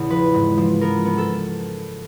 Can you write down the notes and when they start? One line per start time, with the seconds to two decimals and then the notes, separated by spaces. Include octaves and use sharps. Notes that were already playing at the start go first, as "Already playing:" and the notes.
Already playing: E2 A2 C#3
0.10 F3 B4
0.34 G#2
0.57 F3
0.81 B3 A#4
1.05 B3
1.18 A4